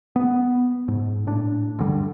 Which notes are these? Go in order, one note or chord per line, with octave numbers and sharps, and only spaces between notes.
B3
G#2
A2 D4
D2 G2 D3 G3